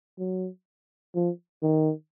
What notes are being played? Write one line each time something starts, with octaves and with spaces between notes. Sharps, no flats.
F#3
F3
D#3